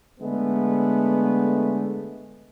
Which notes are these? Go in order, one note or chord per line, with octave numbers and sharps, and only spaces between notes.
D3 G#3 A3 B3